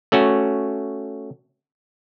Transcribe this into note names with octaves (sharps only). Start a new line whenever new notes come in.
A3 C#4 F#4